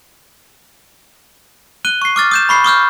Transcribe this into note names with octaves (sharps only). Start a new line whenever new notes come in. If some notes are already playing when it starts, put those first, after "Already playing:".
F#6 D#7 G7
C#6 C7
D6 F6 A6
D#6 G6 E7
B5 C#6 C7
C#6 D#6 F6 G6